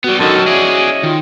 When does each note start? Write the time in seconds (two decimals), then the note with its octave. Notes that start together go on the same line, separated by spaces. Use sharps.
0.04 G3 B3 F#4
0.19 F#2 D3 D#3 F#3 F#4 A4
0.46 C#4 E4 G#4 D5 D#5
1.03 D#3 F4